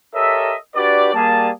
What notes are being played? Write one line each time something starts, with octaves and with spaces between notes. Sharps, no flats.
G4 A4 A#4 C#5 D#5 E5
D4 F#4 G4 B4 D5
G3 A#3 G#4 A5